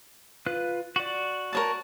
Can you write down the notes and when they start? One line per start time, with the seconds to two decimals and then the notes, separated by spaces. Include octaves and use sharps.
0.46 F4 B4 F#6
0.96 F#4 D5
1.53 A#4 C#5 A5